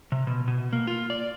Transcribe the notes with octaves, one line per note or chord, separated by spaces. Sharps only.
C3
B2
B2
A#3
F4
D5